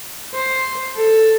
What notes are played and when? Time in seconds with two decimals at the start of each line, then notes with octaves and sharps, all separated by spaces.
0.34 C5
0.96 A4